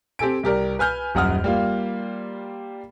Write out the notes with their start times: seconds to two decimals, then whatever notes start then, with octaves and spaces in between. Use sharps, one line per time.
0.19 C4 G4 A4 G#5 D7
0.43 C2 G4 A#4 D5
0.79 B4 G#5 F6 G6
1.15 D#1 F#2 F#5 D#6 F6
1.44 G3 A#3 F4